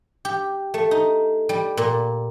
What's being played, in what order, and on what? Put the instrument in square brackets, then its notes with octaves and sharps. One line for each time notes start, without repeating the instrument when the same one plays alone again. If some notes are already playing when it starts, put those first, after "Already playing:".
[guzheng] G4
A3
D#4
G3
A#2